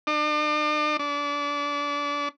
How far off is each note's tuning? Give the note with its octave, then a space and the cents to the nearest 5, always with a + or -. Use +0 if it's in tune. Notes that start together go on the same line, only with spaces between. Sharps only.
D4 +40
D4 -30